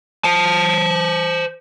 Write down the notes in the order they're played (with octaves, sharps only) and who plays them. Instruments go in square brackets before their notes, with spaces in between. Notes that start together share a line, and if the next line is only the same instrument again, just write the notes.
[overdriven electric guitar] C5 A5